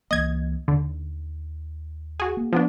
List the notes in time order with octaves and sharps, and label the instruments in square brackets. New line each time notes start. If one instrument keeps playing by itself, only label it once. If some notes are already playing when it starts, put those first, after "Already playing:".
[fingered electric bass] C#2 E3 A#3 [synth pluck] D#5 G#6
[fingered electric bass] D#2 [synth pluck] D3
[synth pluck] F#4 G#4
[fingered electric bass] A#3
[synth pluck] F3 B3 D4